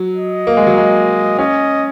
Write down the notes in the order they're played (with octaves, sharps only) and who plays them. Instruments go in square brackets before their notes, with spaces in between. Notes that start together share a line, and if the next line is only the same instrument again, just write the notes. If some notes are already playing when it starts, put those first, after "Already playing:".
Already playing: [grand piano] F#3
[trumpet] D#5
[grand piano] A#3
G#3
F#3
G#3
[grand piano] C#4 [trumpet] D#5